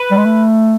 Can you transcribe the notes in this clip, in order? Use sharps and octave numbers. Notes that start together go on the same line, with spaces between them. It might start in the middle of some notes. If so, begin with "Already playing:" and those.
Already playing: B4
G3
G#3
A3